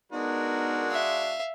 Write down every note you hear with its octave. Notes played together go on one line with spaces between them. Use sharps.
G#3 B3 D4 D#4 F#4 A#4
E5 F5